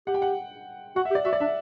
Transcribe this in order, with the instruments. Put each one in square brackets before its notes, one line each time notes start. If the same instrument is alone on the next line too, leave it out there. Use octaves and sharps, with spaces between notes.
[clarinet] G4 [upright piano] F#5
[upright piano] G5
F#5
[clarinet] F#4 [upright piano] F#5
[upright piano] E5
[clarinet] G4
[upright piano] D5
[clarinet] F#4 [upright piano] E5
[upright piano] D5
[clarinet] D4 [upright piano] E5